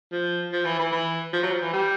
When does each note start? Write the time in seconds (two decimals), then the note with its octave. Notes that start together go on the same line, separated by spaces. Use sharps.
0.12 F3
0.52 F3
0.65 E3
0.79 E3
0.92 E3
1.33 F3
1.43 F#3
1.52 F3
1.62 E3
1.73 G3